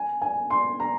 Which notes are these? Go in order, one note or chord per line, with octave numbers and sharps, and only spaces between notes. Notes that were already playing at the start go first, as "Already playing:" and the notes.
Already playing: G#5
G#5
C6
A#5